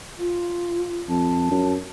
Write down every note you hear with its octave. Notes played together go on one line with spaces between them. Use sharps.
F4
F2 A5
F#2